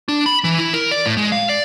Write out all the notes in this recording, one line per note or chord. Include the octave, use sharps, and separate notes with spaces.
D4
B5
E3
E4
A#4
D5
A2
G#3
F5
D5